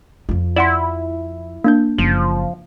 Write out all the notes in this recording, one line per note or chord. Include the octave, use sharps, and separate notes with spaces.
F2 F3
E4 D5 F#5 C6
A#3 D4 G6
F#1 F3